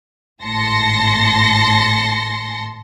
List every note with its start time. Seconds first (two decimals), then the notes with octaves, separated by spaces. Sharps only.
0.42 G#1 A2 A5 C6 A#6 C#7